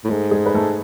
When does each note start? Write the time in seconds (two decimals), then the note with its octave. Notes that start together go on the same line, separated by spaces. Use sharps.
0.04 A2
0.09 G#2 A3 A4
0.31 G#3 G#4
0.46 B4
0.54 A3 A4